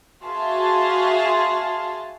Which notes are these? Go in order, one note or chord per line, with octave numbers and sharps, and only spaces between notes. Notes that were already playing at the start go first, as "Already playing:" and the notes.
F#4 G#4 E5 F5 A5 C6